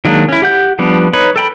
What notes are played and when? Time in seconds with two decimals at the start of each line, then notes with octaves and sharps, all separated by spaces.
0.05 D#3 F#3 G#3 A#3 D4
0.29 C#4 E4
0.42 G4 F#5 G6
0.79 F3 G3 B3 D4
1.13 D#4 B4 C#5 B5
1.36 A4 G5 B5